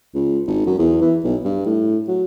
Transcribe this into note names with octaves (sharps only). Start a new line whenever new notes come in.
C#2
G#1
F#2
E2
E3
B1
G2
A2
F#3